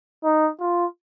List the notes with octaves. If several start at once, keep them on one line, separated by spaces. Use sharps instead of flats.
D#4
F4